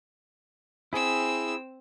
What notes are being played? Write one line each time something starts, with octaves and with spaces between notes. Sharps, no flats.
C4 E4 G#4 E6